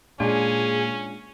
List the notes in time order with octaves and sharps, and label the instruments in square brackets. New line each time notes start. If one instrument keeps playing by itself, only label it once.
[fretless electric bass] A#2 [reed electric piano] G#3 D4 F4 [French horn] C#4 [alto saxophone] G#4